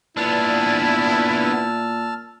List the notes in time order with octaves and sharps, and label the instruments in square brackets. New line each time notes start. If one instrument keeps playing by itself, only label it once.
[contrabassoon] A#2 [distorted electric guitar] B3 D4 [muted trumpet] E4 [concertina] A5 E6 F6